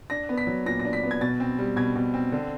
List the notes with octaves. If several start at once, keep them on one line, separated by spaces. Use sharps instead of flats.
D4 A#6
B3
B6
F#3
A#2 A#6
A#6
D4
B6
B3
G#6
B2 A6
C4
G3
B2 G#6
B2
C4
D3